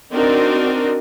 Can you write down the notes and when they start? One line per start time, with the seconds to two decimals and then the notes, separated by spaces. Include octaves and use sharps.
0.12 C4 D4 D#4 F#4 A#4